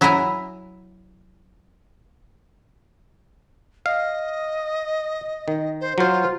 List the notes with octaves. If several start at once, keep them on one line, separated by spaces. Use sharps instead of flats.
F#3 E4 E5 G#5 A#5
D#5 F5
D#3
C5
F#3 F4 C5